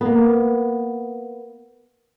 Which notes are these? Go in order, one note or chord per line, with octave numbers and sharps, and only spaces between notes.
A#3 B3